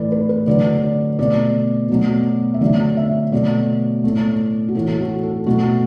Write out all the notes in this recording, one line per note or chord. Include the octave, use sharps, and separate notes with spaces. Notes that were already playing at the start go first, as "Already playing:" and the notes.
Already playing: A2 E3 A3 B4 D5
B4
B4
D3 F#3 A3 D5
D5
B2 A3 D5
B2 F#3 A3
E5
D3 F#3 A3 D5
E5
B2 F#3 A3 D5
A2 A3
F#4
A2 E3 A3 A4
A4
F#4
A4
B2 F#3 A3 F#4